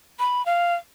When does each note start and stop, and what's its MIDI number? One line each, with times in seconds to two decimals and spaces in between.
0.19 0.45 83
0.46 0.74 77